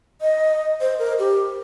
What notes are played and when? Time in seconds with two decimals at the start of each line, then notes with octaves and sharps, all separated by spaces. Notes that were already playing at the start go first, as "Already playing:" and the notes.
0.21 D#5
0.81 C5
0.99 A#4
1.19 G4